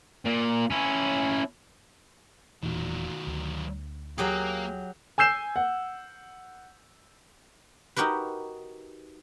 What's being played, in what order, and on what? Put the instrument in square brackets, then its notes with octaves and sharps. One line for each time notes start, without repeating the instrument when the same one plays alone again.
[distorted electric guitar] A#2
C#4 E4
[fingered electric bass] E1 A#2 E3 [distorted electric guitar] D#3 F#3
[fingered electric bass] D2
[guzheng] F#3 G4 G#4 [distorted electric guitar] A#3
[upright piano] G#5 E6 G6 C7 E7
F#5
[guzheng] D#4 F#4 G4 A#4 B4